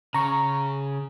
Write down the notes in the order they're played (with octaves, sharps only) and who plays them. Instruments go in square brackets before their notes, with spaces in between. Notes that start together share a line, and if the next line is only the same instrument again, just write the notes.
[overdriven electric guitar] C#3 [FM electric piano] A#5 C#6